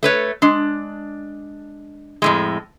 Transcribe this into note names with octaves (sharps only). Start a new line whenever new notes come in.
A3 B4 C#5
G#3 D4
F2 A2 G#3